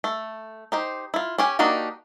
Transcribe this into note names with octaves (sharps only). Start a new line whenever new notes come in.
A3
D#4 G4 C5
E4 F4
C#4 G4 G#5
A#3 D4 D#4 F#4 G4